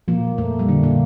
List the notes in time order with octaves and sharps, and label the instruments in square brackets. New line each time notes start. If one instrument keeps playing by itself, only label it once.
[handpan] A#2 A#3 [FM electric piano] F3
[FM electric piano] F2 [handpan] A3
[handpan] G3
[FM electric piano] D3 [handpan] A3
[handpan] A#2 A#3